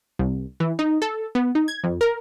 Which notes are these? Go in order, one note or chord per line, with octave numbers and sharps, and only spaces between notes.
C2
E3
D#4
A4
B3
D#4
G#6
F2
A#4